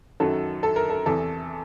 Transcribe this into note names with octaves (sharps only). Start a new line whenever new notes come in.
F#2 D#3 F#3 A4
A4
A#4
A4
E2 C3 E3 A4